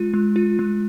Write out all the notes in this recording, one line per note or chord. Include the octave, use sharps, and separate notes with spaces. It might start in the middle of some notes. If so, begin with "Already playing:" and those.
Already playing: G#3 F4
G#3
F4
G#3